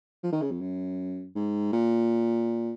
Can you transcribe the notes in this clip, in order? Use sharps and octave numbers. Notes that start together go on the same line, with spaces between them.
F3
D#3
C#3
F2
F#2
G#2
A#2